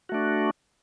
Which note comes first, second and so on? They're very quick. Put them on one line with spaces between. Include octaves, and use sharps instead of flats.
F#4 A3 D4